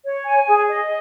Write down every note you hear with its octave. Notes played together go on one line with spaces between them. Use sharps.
C#5
G#5
G#4
D#5